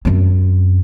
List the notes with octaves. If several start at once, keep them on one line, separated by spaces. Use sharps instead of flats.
F#2 C4